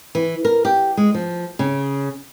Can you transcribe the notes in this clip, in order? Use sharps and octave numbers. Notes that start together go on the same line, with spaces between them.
E3
A#4
G4
G#3
F3
C#3